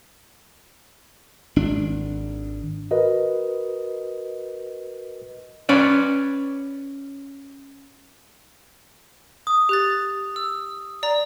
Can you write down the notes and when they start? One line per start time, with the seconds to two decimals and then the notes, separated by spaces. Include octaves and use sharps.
1.56 G#1 D4
2.91 F#4 A#4 B4 D#5
5.69 C#4 B4 D5
9.47 D#6
9.69 G4 F#6 A6
10.36 E6
11.03 D5 A#5